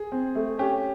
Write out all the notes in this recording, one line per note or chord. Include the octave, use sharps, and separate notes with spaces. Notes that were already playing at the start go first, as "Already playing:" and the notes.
Already playing: G#4
C4
A3
C#4 G4